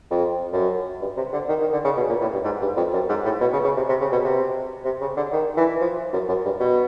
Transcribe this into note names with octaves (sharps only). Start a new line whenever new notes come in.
F2
F#2
G2
C3
D3
D#3
D#3
D3
C#3
B2
A#2
A2
G2
G#2
G2
F2
F#2
G#2
A2
B2
C#3
C#3
C3
C3
C#3
B2
C3
C3
C#3
D3
D#3
E3
F3
F#2
F#2
G2
B2